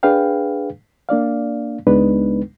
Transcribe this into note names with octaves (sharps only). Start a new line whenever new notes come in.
D4 G#4 B4 F5 G5
A#3 D4 D5 F5
C#2 G#3 B3 D4 D#4 B4